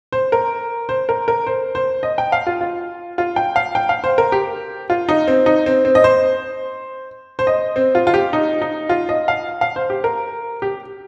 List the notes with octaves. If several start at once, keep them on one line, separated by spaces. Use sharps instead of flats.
C5
A#4
C5
A#4
A#4
C5
C5
D#5
G5
F5
F4
F4
F4
G5
F5
G5
F5
C5
A#4
G4
F4
D#4
C4
D#4
C4
C4
D#5
C5
C5
D#5
C4
F4
F4
G4
D#4
D#4
F4
D#5
F5
F5
C5
G4
A#4
G4